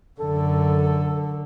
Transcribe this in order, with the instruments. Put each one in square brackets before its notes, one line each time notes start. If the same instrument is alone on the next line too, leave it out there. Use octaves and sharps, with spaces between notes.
[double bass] F#2 D3 [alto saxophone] A4